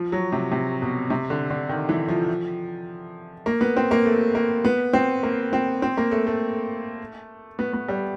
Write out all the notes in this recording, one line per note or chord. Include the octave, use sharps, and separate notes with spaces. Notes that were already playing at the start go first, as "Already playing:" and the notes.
Already playing: F3
F#3
C3
C3
B2
C3
D3
D3
D#3
E3
F3
A#3
B3
C4
A#3
A3
A#3
B3
C4
A#3
C4
C4
A#3
A3
A3
B3
B3
G3